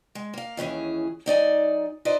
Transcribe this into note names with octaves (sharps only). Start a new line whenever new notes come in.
G#3
A#3 F5
D#2 E3 C#4 G#4
F#3 D#4 D5 G#5
D#4 B4 C5 D5 D#5